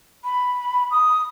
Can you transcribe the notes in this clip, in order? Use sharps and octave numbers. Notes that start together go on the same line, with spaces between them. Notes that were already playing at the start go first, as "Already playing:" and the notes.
B5
D#6